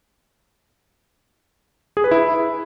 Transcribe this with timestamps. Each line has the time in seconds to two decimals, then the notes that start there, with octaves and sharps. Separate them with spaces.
1.97 G#4
2.04 B4
2.11 E4